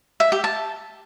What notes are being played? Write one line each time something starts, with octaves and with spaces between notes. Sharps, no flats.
E5
G4
A5